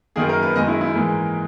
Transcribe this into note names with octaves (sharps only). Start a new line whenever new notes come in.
F#2 D#3 A#3 G#4
A#4
B4
F#2 D#3 G#3 D#5
E4
E4
G#2 E3 A#3